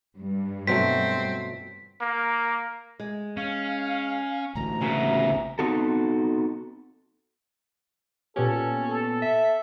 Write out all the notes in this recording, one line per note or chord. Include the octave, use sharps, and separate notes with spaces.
G2
B2 F#3 A3 C4 B6
A#3
G#3
C#4 F5
A1 D2 A#5
C#3 A#3 B3 F#4 E5
B3 C4 D#4 F#4 A4
A#2 B3 C#4 G4 A4
A4
E5